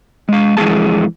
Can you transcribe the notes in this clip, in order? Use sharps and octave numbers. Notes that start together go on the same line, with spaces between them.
G#3 F5
F2 E3 G#3 B3 G#4 A5